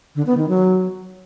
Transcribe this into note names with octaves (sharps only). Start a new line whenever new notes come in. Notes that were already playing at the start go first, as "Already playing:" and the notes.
D3
B3
D#3
F#3